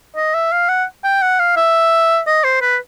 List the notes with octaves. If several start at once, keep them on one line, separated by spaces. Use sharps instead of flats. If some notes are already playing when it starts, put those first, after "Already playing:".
D#5
E5
F5
F#5
G5
F#5
F5
E5
D#5
C5
B4